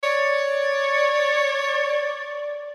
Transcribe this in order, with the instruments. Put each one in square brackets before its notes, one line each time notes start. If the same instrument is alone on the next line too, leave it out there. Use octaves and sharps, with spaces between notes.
[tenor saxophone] C#5 [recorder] D5